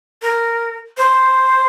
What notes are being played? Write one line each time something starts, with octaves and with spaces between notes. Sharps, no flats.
A#4
C5